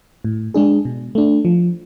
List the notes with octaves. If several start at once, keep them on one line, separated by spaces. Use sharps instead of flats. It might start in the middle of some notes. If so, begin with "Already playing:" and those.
A2
G#3 D4 G#4
B2
A3 D4
F3